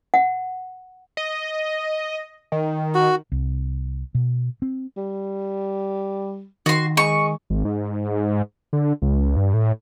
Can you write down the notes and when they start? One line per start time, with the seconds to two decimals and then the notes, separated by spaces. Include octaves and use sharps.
0.14 F#5
1.17 D#5
2.52 D#3
2.95 F#4
3.32 C2
4.15 B2
4.62 C4
4.97 G3
6.66 D#3 F#4 C6
6.97 G#3 C#6
7.50 G#1
7.65 G#2
8.73 D3
9.02 C#2
9.37 G2
9.54 A2